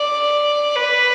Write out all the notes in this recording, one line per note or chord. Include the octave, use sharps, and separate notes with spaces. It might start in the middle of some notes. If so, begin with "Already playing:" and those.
Already playing: D5
B4